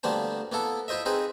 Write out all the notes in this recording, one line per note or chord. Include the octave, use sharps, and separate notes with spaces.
D2 G3 A#3 B3 C5 A5
A#3 B3 E4 A4
E4 F4 C5 D#5 E5
C4 D#4 G#4 B4 C5